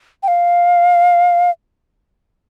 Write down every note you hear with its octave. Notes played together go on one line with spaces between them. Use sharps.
G5
F5